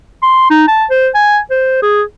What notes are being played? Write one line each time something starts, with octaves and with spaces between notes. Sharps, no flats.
C6
D#4
A5
C5
G#5
C5
G#4